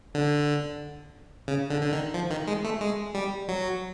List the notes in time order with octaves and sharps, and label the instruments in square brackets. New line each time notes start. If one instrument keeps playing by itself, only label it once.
[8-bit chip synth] D3
C#3
D3
D3
D#3
F3
D#3
G#3
A3
G#3
G3
F#3